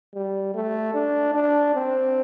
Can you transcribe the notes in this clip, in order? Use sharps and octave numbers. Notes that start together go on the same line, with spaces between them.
G3
A3
D4
D4
C4